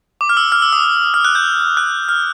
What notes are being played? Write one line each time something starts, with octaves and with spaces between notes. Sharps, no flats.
D6
F6
E6
F6
E6
D#6
F6
F#6
G6
F#6
F6